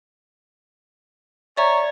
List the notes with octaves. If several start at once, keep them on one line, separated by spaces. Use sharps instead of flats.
C#5 D5 E5 A#5